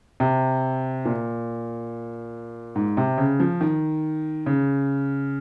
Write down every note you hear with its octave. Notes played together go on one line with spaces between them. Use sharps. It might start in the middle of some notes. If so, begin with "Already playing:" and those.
C3
A#2
G#2
C3
C#3
F3
D#3
C#3